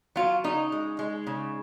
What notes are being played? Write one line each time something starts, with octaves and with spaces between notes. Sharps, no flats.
F#3 F4
C#3 D#4
G#3
G#3
C#3